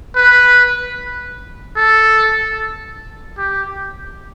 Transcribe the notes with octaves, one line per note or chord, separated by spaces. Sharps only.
B4
A4
G4